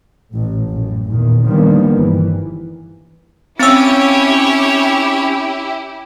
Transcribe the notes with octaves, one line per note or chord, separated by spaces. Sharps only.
A1 A2
F#2 A2
E2 A#2 D#3
D3 D#3 F3 G3 A#3 B3
G1 E3
C4 C#4 E4 G4 C#5 E6